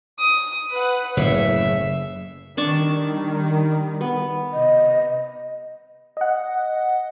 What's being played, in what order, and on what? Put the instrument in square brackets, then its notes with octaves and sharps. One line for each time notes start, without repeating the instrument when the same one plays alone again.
[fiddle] D#6
B4 F#5
[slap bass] F#1 A2 C#3 [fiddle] E5
[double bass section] D#3 G3 [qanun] D4 A5 C#6
[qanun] B3
[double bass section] C3 [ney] D#5
[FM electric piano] D#5 F#5